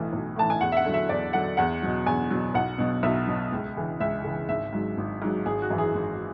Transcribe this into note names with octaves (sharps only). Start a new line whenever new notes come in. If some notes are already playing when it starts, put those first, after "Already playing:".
Already playing: B1 A2 E3
B1
A2 E3 A5
G#5
E2 F#5
E5
F#5
D3 F#3
E5
E2 D5
D3 F#3 F#5
E2 F#5
B2 F#3
E2 G#5
B2 F#3
B1 F#5
B2 F#3
B1 E5
B2 F#3
C#2
C#3 E3
C#2 E5
C#3 E3
G#1 E5
G#2 F#3
G#1
G#2 F#3
G#1 G#4
F#4
F#2 E3
G#4
G#1